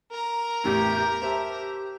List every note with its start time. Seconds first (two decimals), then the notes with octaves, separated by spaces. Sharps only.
0.11 A#4 A#5
0.64 A1 E2 A2 G4
1.22 G4 C5 E5 A5